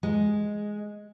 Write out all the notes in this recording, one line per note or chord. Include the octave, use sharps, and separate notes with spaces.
G#3